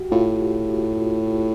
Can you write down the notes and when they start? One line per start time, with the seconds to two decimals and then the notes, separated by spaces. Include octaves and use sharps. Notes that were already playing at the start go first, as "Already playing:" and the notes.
Already playing: F#4 G4
0.12 A2 F4